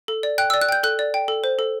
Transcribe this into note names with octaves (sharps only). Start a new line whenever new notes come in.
A4
D5
G5 F#6
E6
D5
F#6
G5 G6
A4 F#6
D5
G5
A4
C5
A4